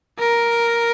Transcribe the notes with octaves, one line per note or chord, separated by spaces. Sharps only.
A#4